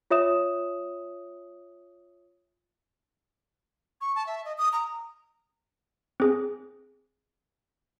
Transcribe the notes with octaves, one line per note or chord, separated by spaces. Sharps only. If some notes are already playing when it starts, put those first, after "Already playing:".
F4 C#5 E5 D#6 E7
C#6
A5
E5
D#5
D#6
A#5
C4 G#4